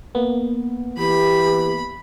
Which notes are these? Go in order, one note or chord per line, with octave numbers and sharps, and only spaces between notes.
A#3 B3
E3 G4 B5